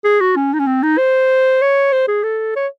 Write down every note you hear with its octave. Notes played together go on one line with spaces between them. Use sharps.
G#4
F#4
C#4
D#4
C#4
C4
D#4
C5
C#5
C5
G#4
A4
C#5